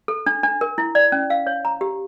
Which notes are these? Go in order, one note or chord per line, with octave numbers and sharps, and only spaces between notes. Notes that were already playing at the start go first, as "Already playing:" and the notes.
A4
D4
D4
A#4
E4
D5
C#4
F5
C#5
A#5
G4